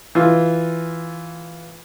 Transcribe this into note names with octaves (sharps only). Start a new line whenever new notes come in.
E3 F4